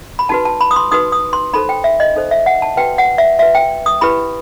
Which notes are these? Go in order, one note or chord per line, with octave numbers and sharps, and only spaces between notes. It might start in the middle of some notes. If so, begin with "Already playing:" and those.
B5
D#4 F#4 B4 A5
A5
B5
D#6
C6
D#4 F#4 B4 D#6
D#6
C6
D#4 A4 C5 B5
G5
E5
D#5
D#4 A4 C5
E5
F#5
A5
F#4 B4 G5
F#5
E5
F#4 B4 E5
G5
D#6
E4 G4 B4 B5